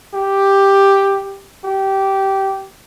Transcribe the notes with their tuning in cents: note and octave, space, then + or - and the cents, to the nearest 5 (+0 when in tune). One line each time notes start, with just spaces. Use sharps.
G4 +5
G4 -15